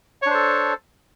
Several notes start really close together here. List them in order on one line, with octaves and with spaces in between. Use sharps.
C#5 D4 C5 A4